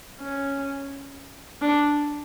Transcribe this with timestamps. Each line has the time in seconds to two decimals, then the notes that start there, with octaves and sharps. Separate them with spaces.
0.21 C#4
1.62 D4